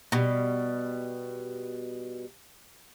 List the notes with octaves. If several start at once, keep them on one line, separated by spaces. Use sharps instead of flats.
B2 G3